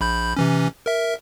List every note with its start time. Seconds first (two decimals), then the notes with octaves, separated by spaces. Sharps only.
0.01 A#1 B5 G6
0.37 C3 E3 C#4
0.86 A#4 E5